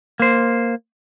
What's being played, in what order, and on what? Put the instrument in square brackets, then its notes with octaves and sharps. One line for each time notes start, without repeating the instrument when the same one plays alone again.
[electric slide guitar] A#3 C5